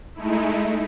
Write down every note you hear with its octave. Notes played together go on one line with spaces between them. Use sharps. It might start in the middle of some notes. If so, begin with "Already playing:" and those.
G#3 A3 D#4 E4